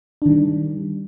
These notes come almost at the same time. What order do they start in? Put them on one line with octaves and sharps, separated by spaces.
D4 D#3 G3